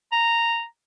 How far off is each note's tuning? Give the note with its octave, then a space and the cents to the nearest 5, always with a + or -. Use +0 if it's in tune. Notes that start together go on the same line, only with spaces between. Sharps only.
A#5 -10